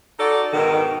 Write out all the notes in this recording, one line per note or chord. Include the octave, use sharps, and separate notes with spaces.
D#4 F#4 A4 D5
G#2 B2 D#3